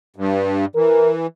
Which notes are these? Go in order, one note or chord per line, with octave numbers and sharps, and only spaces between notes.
G2
E3 A#4